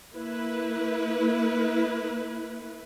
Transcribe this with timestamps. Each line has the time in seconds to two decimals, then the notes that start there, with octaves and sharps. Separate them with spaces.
0.16 A#3 E4 B4